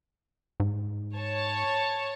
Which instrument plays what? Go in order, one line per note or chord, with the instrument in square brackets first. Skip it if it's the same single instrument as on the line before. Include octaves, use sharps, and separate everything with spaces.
[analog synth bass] G#2
[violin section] C#5 A5